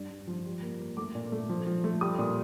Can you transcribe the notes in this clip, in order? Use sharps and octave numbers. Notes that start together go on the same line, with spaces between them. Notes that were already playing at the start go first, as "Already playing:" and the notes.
Already playing: G2
G2
F3
G3
A#3
A#3
A3 D6
A#2
A3
F3
F3
A3
G3 D#6
A#2